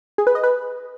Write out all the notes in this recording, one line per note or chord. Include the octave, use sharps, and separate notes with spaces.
G#4
B4
D#5
B4